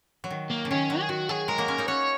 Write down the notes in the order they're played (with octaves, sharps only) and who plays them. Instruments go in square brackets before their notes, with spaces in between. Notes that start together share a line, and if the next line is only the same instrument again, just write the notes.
[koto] F#3
D#3
[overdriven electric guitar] A#3
[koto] C#3
[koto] D#3 [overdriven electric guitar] C#4
[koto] F#3
[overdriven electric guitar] G#4
[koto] D#3 [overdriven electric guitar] F#4
[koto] F#3 [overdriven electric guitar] G#4
[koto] G#3 [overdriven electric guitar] A#4
[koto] F#3 A#3
G#3 C#4
A#3 D#4
[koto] C#4 F#4 [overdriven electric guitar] C#5